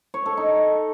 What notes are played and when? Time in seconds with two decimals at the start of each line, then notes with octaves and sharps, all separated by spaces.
0.14 C#5
0.26 A4
0.37 D#4